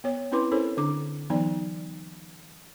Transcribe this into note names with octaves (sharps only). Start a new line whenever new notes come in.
B3 C#5
C4 C#4 E4 B4 C6 D6
C#4 E4 A4 A#4 C5 C#5
D3 D4 D6
E3 F#3 B3 D#4 D5